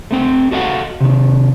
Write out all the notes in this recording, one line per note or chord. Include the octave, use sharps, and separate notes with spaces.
A3 C4 G5
F#4 A4 D#5 F5 F#5
C3 D#3